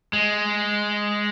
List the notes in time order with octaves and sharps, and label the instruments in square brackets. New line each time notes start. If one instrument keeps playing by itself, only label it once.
[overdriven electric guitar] G#3